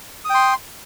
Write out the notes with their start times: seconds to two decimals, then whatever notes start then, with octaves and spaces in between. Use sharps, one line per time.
0.25 D#6
0.30 G5
0.34 C6